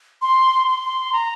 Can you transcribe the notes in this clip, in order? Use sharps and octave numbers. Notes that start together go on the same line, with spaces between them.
C6
C6
A#5